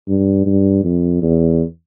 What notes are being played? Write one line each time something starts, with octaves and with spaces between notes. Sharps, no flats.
G2
G2
F2
E2